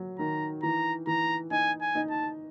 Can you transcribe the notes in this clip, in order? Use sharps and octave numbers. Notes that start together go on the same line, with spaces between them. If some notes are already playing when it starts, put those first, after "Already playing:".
Already playing: F#3
D#3 A#5
E3 A#5
E3 A#5
D#4 G#5
G#5
D#4
A5